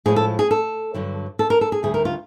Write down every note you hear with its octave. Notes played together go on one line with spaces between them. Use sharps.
A2 F3 G#3 G#4
A4
G#4
A4
G2 D3 F#3
A4
A#4
A4
G#4
D2 D3 G3 G#4
A#4
F4